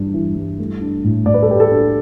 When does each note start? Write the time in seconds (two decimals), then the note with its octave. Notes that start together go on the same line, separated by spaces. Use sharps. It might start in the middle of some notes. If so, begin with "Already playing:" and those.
Already playing: G2 E3 G3 D4
0.14 E3
0.36 G3
0.59 A3
0.81 D4
1.04 A2
1.26 A2 D5
1.34 B4
1.42 A4
1.48 A3 G4 B4
1.60 A4
1.71 D4